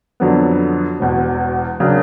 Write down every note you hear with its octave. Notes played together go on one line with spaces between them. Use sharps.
F2 D3 F#3 B3
E1 E2 B2
C#3 F#3 A#3 D4